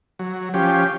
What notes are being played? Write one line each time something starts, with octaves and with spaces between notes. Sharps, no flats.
F#3
F3 C#4 G4